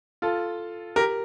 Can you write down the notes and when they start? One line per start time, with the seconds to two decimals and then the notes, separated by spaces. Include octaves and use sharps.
0.22 F4 A4
0.96 G4 A#4